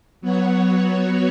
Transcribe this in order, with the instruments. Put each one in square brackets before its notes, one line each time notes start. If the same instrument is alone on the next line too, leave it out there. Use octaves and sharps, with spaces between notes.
[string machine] F#3 B3 F#4 C#5